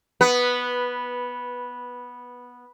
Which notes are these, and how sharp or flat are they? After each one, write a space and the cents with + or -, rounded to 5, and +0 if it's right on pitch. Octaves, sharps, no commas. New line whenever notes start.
B3 -10 B4 +0